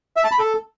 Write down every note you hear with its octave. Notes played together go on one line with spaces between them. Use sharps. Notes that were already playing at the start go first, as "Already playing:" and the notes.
E5
A5
B5
A4